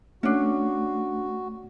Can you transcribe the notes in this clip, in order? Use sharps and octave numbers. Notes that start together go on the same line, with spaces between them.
A3 C#4 D4 F#4